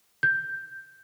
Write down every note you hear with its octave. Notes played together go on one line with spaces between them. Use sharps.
G6